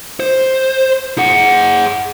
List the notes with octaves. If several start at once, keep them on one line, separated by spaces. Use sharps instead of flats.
C5
G#4 F#5